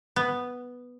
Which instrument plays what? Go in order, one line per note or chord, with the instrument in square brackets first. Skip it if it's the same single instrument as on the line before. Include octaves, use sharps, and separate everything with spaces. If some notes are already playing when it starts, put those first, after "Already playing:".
[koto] B3